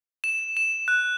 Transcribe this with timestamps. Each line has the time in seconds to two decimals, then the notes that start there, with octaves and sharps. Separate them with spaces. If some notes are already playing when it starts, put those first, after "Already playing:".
0.24 E7
0.57 E7
0.88 F#6